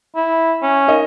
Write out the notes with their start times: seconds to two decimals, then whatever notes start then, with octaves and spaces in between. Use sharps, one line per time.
0.16 E4
0.62 C#4
0.87 D#4 A#4 D#5